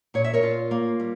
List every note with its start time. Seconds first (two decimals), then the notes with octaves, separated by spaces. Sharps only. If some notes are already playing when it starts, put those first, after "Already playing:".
0.14 A#2 C#5
0.24 E5
0.33 A#4 C#5
0.43 F4
0.71 A#3
1.00 G3